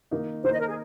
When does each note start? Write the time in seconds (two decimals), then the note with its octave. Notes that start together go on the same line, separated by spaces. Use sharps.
0.11 D#3 A#3 D#4
0.44 D#3 A#3 D#4 C5
0.53 D#5
0.60 A#4
0.68 G#4